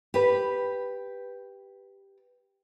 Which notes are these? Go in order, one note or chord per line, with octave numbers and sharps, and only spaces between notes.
G4 B4